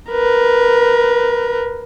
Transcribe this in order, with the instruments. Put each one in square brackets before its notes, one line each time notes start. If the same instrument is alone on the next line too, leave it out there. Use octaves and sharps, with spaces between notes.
[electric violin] A#4 B4